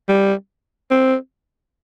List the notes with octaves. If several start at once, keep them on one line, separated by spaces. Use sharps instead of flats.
G3
C4